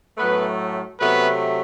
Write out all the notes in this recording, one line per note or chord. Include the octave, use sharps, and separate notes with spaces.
A2 F#3 A3 B3 B4
C3 F#3 A3 B3 B4